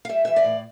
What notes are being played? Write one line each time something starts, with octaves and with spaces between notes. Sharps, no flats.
F5
G3 E5
E3 E5
D5
A2